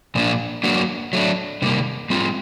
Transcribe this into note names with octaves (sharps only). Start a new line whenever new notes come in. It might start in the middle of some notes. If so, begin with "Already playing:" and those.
A#2 F3 A#3 D4
F#3 A#3 D4 F#4
F#3 A3 D4
C3 D#3 G3 A#3
G3 C4 F4